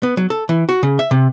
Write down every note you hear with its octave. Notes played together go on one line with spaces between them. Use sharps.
B3
F#3
A4
E3
F#4
C#3
E5
C3